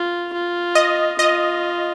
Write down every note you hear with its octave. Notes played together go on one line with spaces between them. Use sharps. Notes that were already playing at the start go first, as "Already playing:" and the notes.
Already playing: F4
F4
D#5
F4 D#5